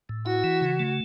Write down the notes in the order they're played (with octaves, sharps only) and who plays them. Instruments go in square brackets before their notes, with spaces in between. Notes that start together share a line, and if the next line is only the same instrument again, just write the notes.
[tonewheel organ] A2
[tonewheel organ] E4 [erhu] F#4
[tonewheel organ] E3
C#3
A3